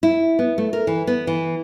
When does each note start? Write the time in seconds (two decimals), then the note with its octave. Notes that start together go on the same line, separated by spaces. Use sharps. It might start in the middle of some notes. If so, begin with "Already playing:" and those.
0.03 E4
0.39 B3
0.58 A3
0.73 A#4
0.87 E3
1.07 B3
1.27 E3